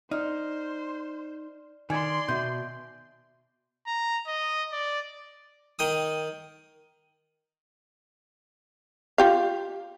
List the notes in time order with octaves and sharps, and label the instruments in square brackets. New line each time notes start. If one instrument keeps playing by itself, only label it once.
[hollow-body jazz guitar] D#4 [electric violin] C5 [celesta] D5 F6
[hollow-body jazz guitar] D#3 [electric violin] D5 C6 [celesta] G#5 G#6
[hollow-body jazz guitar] B2 [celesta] E5 G6
[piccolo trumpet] A#5
D#5
D5
[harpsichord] D#3 G5 D#6
[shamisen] F4 G4 F5